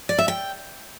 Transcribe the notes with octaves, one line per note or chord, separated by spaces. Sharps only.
D5
E5
G5